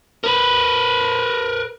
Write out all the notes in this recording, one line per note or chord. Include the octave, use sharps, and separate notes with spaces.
A#4 B4